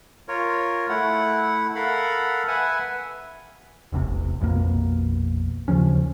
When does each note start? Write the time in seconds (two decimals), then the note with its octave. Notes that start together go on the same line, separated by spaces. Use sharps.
0.28 F4 A#4 C#5
0.89 A3 E4 F#5
1.75 A4 A#4 F5 F#5 B5
2.48 B4 E5 F#5 G#5
3.92 E1 A1 C3
4.40 A#1 F2 B2 A#3
5.68 D#2 C#3 F3 C#4